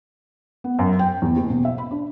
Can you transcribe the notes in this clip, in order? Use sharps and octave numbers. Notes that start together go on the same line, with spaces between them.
B3
F#2
G5
E2
F#1
B2
E5
B5
D4